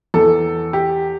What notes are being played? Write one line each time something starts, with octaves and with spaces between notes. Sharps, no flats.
E2 E3 A4
G4